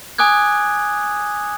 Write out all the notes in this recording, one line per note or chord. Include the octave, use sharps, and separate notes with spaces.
G#5 D6 D#6 F#6 G#6